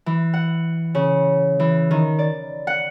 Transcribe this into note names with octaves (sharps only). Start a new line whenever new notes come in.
E3
F#5
C#3
E3
D#3
D5
F#5